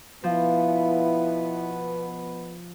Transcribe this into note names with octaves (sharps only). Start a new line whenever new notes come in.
B2 F3 B3 E4 B4